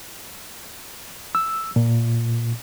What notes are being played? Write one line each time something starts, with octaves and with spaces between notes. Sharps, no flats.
E6
A#2